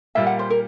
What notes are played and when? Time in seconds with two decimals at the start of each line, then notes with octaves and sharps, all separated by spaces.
0.15 A#2 G3 A#3 E5
0.27 F#5
0.39 C5
0.50 A#4